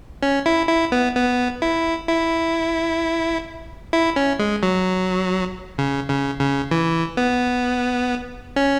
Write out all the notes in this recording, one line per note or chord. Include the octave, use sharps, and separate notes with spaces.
C#4
E4
E4
B3
B3
E4
E4
E4
C#4
G#3
F#3
C#3
C#3
C#3
E3
B3
C#4